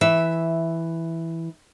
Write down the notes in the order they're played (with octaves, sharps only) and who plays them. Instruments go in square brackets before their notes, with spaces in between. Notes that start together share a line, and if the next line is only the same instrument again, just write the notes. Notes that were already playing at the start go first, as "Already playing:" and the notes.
[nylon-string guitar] E3 E5